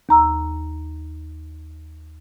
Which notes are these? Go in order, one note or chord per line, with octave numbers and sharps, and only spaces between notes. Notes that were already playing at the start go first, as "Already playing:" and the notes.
D#2 A#5 E6